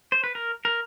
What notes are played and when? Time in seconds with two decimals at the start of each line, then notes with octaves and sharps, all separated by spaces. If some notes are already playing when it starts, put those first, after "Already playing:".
0.12 C5
0.24 B4
0.35 A#4
0.65 A#4